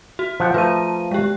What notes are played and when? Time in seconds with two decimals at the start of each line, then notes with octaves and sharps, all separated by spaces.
0.19 F#4
0.40 F3 F#5 G5
0.54 F3 A3 B4 A#5 D#7
1.11 G#3 G4